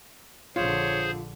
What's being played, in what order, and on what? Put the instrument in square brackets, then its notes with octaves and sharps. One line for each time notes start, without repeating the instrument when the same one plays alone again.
[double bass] A#1 D3 [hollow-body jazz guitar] F4 [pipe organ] G#4 C5 [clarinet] C#5